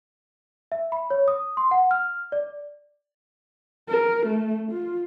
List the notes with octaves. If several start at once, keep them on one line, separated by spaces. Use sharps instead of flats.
E5
B5
C#5
D#6
C6
F#5
F6
D5
A#4
A3
F4